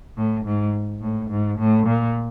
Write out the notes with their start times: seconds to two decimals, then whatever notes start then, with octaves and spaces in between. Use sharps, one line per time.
0.17 A2
0.45 G#2
1.02 A2
1.30 G#2
1.59 A2
1.87 A#2